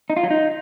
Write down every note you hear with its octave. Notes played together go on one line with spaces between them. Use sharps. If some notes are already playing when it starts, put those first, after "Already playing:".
D#4
F4
F#3
D#4